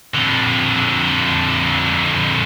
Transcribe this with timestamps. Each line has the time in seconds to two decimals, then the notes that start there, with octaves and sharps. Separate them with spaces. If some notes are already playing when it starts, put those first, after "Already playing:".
0.14 F2 D3